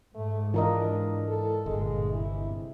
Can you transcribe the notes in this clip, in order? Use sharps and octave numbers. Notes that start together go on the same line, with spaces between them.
G#2 A3
E3 D4 F4 A#4 D#5
A4
G1 G2 A#2 G#3
C3 E4